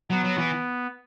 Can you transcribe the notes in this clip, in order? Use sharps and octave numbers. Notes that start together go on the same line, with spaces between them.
F#3 B3
F#3
E3